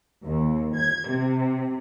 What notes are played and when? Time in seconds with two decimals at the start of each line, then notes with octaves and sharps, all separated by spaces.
0.23 D#2
0.73 G#6
1.07 C3